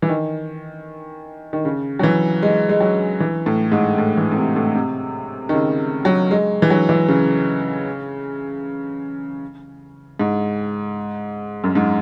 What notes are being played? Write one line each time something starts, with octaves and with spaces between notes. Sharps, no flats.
E3
D#3
D#3
C#3
F#3
E3
G#3
G#3
F#3
E3
A2
G#2
A2
E3
A2
C3
A2
C3
D#3
C#3
F#3
G#3
E3
F#3
E3
C#3
G#2
F#2
G#2